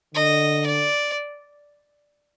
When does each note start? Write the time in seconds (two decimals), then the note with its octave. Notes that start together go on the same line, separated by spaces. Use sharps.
0.15 D3 D#5
0.66 D5